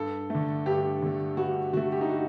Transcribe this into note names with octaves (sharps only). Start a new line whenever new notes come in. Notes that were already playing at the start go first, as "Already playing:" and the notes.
Already playing: G2 A4
D3 A3
G2 G4
D3 A3
G2 F#4
D3 A3 F#4
G4
D#4
F#4